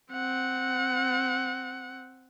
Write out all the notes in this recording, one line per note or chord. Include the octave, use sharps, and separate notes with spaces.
C4 F#5